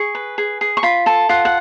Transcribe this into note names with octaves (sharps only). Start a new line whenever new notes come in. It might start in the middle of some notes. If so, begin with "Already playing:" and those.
Already playing: G#4 C#6
B4
G#4
G#4
C#6
F4 B5
A4 A5
F4 F#5
F#5